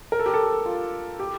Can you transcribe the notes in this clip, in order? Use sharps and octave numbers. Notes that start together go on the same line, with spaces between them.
A#4
A4
G4
A4
F4
G4